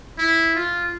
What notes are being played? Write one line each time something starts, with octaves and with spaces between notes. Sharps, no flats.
E4
F4